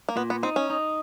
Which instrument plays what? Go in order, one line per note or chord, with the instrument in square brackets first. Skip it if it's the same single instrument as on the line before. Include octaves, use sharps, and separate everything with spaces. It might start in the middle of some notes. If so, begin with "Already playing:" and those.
[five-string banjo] A#3
[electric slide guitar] A#2 [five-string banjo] B3
[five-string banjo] B3
[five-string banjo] C4 [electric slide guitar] D#4
[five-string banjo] C#4
[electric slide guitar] D#4